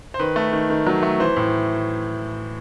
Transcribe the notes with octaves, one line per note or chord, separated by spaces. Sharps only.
C5
D#3 B4
A3
D#3
D#3
F#3
A3
E3 C5
A2